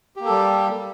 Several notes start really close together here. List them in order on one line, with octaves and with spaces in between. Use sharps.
G4 A#3 A4 G3